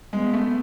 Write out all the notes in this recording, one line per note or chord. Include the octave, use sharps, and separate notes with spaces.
G#3 B3
A3